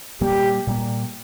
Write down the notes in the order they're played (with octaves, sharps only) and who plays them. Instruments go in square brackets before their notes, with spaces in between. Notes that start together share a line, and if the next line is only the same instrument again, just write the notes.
[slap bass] A#2 G3 A#3 [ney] G4
[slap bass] A#2 G3 A#3